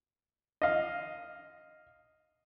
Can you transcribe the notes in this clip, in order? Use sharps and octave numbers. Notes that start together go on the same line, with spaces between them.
D#5 F5